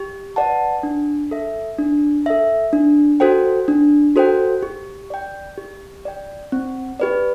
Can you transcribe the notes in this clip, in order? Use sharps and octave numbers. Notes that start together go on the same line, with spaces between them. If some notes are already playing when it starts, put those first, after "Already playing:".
Already playing: G4
B4 D5 F#5 A5
D4
A4 E5
D4
A4 E5
D4
F#4 A4 C5 G5
D4
F#4 A4 C5 G5
G4
D5 G5
G4
D5 G5
C4
G4 B4 D5